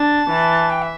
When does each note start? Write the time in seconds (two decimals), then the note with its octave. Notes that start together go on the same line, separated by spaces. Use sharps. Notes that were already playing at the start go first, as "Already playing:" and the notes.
Already playing: D4 A5
0.30 E3
0.70 G5
0.82 E5